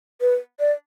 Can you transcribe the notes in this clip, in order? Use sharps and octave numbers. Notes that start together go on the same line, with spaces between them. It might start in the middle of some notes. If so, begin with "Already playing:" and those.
B4
D5